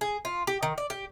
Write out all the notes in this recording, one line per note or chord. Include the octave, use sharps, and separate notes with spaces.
G#4
F4
G4
D#3
D5
G4